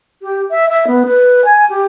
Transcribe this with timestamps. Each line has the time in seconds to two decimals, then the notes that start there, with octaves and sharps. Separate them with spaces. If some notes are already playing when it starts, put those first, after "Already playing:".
0.22 G4
0.51 E5
0.69 E5
0.87 B3
1.05 B4
1.45 G#5
1.70 G4